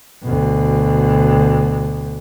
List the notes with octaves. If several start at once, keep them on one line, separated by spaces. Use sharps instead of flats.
D2 B2